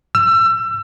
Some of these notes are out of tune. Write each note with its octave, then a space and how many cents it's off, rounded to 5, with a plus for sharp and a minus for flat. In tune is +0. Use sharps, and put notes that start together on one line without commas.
E6 +30